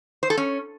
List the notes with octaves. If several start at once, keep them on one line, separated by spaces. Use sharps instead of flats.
C5
A4
C#4